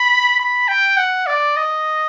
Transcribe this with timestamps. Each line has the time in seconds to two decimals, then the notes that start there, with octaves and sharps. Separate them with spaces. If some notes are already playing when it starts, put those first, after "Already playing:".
Already playing: B5
0.39 B5
0.68 G5
0.97 F#5
1.27 D5
1.56 D#5